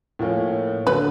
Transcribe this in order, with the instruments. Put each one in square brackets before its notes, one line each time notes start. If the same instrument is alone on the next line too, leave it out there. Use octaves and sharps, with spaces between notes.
[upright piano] A2 F3 A#3 C#4
[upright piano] D3 F#3 [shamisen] B4